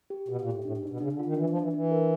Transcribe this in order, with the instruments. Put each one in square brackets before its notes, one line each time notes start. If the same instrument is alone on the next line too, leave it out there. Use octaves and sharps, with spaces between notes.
[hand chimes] G4
[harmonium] B2 [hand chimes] G4
[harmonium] A#2
[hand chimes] G4
[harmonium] A2
[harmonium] A2 [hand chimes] D4
[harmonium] G#2
[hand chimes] D4
[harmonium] B2
[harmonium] C#3 [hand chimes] D4
[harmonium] D3
[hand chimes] F4
[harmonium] D#3
[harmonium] E3 [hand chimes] D4
[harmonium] F3
[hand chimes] D4
[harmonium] E3
[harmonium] E3 [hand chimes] D4
[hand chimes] A#4